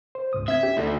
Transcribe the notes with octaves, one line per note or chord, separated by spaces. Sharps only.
C5
C#2 G#2 D#6
C4 E5 G#6
C#4 G4
D2 D#4 A4 D5